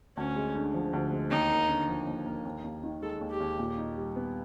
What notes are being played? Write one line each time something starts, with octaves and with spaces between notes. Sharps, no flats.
D2 C#4
G#3
D3
F3
D2
G#3
D#2 D#4
A#3
D3
F3
D#2
A#3
D#2
D#2
D#3
G#3 A4
D#2
G4
D#2
A#2
D#4
G3
B3